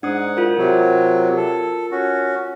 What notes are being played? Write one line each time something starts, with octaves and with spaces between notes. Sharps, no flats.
G#2 D4 F#5 D#6
F4 A#4
C3 F#3
A4
C#4 F#4